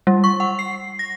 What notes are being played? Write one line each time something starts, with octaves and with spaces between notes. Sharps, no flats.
G3
C#6
F#5
C7
A#6